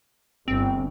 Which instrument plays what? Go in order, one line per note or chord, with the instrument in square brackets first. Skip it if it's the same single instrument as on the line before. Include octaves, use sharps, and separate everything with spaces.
[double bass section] G1 [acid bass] C4